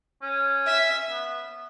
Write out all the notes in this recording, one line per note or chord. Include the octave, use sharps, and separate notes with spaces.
C#4
E5
B3